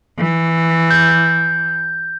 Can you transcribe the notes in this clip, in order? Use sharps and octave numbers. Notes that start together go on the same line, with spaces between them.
E3
G6